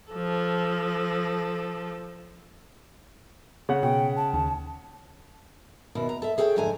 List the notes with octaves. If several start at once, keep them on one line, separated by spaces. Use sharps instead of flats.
F3 A4
C#3 F#5
B2 G5
A5
D#2
D#2 B2 E4
A#5
A4 E5
G#4 A4 C#5 G5
F2 G#2 D3 A3 G#5 A#5